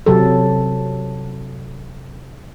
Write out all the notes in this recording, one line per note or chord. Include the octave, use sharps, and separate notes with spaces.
C3 F#3 A4